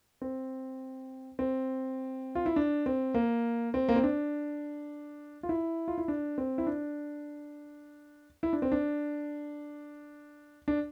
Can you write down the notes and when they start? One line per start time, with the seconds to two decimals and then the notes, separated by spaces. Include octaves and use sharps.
0.22 C4
1.39 C4
2.35 F4
2.46 E4
2.56 D4
2.86 C4
3.14 A#3
3.74 C4
3.89 A#3
3.96 C4
4.03 D4
5.43 F4
5.49 E4
5.88 F4
5.98 E4
6.08 D4
6.38 C4
6.58 E4
6.67 D4
8.43 E4
8.53 D4
8.62 C4
8.72 D4
10.68 D4